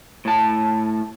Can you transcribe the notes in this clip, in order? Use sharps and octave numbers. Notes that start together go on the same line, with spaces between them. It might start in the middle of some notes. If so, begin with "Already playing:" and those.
A2 A5